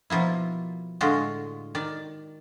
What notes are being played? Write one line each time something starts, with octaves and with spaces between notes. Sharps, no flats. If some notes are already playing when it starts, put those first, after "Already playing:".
B2 F3 A#3 E4
A2 D3 G#3 F4 F#4
D#3 D5